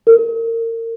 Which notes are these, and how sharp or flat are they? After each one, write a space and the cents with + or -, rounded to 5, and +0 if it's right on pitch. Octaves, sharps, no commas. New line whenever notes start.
A#4 -30